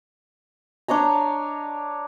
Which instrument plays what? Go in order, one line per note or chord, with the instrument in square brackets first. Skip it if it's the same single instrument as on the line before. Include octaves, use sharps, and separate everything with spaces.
[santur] D4 C#5 D#5 A#5